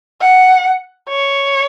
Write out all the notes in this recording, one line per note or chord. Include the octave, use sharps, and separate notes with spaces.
F#5
C#5